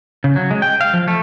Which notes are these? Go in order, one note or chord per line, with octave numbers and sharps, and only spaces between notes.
C#3
F#3
G#3
G5
F5
F3
A3